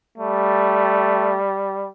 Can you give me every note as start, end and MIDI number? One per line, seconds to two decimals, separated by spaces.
0.18 1.88 55
0.18 1.38 57